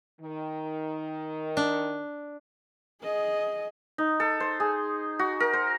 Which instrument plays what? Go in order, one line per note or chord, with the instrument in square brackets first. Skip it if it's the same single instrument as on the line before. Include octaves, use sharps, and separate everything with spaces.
[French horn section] D#3
[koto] D4
[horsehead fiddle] G#4 D#5
[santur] D#4
A4
C5
G#4
F#4
A#4
C5